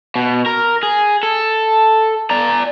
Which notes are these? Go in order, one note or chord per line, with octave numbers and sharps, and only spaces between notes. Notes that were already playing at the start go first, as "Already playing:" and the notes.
B2
A#4
G#4
A4
D5 A#5